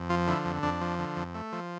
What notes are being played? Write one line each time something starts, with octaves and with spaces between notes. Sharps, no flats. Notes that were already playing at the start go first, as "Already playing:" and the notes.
Already playing: F2
F3 F4
D3 E4
F2
F2 D4
F3
D3
F2
A3
F3